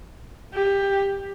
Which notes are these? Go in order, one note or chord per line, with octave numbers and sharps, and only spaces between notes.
G4